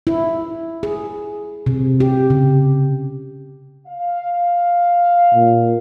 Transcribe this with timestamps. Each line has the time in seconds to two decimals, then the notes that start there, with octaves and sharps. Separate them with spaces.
0.07 E4
0.83 G#4
1.66 C3
2.00 G4
2.30 C#3
3.87 F5
5.34 A#2